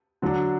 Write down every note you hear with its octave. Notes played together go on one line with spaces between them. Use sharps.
D3 F#3 D4